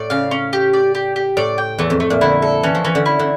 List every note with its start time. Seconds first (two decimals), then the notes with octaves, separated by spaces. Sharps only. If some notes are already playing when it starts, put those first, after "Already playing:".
Already playing: A2 D5
0.10 C#3 F5
0.31 C#4
0.53 G4
0.74 D5
0.95 G4
1.16 G4
1.37 A2 D5
1.58 G5
1.78 E2 A3
1.90 F2
2.00 A3
2.10 A#2
2.21 D3 E4
2.42 A4
2.63 E3 C#4
2.75 F3
2.85 E3 C#4
2.95 D3
3.06 E4
3.19 D3